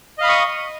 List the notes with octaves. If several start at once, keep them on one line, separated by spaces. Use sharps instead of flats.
D#5 F5 B5 C#6 D#6